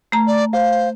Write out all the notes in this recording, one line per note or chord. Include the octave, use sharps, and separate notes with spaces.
A3 A#5
D5
C5 F5